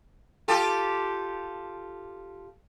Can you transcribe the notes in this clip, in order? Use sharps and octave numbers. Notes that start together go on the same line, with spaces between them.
F4 G4 A4